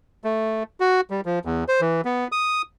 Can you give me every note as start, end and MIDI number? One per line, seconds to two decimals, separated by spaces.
0.24 0.63 57
0.80 1.01 66
1.10 1.21 55
1.25 1.39 53
1.45 1.64 40
1.68 1.81 72
1.81 2.01 52
2.05 2.28 59
2.32 2.62 87